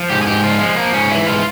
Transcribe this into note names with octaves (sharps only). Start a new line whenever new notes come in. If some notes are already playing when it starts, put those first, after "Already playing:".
Already playing: F3
G#2 G4
G#4
G#2 G4
F3 F4
F3 G#3
F3 A#3
G#2 C#4
E3 E4
G#2 F4